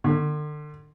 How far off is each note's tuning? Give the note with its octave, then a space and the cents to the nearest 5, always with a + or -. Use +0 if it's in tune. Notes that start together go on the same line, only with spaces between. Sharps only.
D3 +40